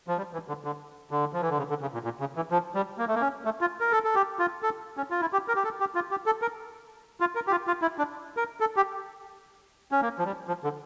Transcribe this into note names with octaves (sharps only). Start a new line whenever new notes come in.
F3
G3
E3
D3
D3
D3
F3
E3
D3
C#3
D3
C#3
A#2
A#2
C#3
E3
F3
G3
A#3
A3
A#3
C#4
A3
F4
A#4
A4
A4
G4
F4
A4
C#4
F4
E4
G4
A#4
G4
A4
G4
F4
G4
A4
A#4
F4
A#4
G4
F4
F4
E4
D4
A#4
A4
G4
C#4
A#3
F3
G3
F3
D3